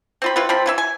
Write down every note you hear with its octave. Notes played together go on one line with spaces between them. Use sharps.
C4 F4 B5
G3 E4 F4 B4
F3 C4 B5
E3 E4 E5
G#5